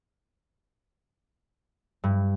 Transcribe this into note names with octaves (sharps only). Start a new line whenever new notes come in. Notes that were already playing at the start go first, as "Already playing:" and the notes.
G2